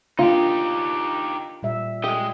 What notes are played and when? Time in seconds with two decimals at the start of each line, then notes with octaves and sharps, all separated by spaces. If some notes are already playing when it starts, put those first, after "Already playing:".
0.19 D3 A#3 D#4 F4 G4
1.63 A#2 G3 E5
2.04 G#3 G4 D#5